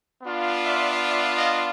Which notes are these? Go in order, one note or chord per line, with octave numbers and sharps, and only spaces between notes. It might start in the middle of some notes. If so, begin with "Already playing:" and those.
B3 D4 F4
D5 E5
D5 E5
D#5 F5